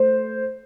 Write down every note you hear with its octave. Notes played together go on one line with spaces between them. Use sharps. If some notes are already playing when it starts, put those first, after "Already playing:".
Already playing: A3 C5